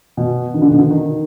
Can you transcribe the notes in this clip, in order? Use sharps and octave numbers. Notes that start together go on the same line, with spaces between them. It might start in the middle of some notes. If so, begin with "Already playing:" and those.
B2
D#3
D3
B2
D3
D#3